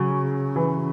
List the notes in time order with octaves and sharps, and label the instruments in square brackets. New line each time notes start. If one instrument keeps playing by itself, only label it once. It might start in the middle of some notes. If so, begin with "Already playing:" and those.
Already playing: [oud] C#3 [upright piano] F#3
[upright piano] E3